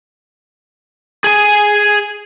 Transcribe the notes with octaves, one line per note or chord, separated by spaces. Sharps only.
G#4 G#5